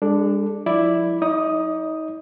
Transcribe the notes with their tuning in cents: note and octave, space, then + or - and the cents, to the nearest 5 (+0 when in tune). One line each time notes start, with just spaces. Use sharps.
G#3 -40 D4 +0 A4 +0
F3 +25 E4 +0 D5 +0
D#4 +30 D5 -20 D#6 +0